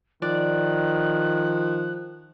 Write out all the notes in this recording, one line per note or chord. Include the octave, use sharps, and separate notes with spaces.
D#3 F3 D5 F#6